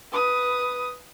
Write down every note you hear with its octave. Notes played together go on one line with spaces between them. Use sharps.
B4 D#6